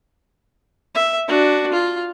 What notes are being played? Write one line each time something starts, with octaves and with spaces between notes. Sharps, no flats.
E5
D4 F#4
F4